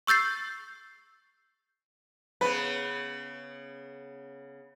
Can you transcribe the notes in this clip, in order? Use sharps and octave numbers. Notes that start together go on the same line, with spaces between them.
C#6 E6 G6 A6 C7
C#3 B3 B4